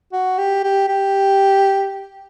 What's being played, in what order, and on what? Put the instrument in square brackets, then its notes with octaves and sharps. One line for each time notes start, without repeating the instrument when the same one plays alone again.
[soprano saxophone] F#4
G4
G4
G4